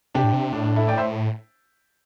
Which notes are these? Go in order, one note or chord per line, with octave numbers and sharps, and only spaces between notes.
C3 D4 G4
A2
C3
A2 D4
D4
E4 A4
D5 G5
C5 E5